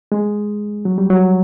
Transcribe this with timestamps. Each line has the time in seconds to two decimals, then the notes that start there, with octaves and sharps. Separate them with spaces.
0.12 G#3
0.85 F#3
0.98 G3
1.10 F#3